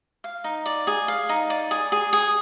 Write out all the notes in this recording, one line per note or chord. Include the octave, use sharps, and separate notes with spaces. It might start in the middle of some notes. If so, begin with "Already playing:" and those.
F5
D#4
D5
G#4
F5
D#4
D5
G#4
G#4
G#4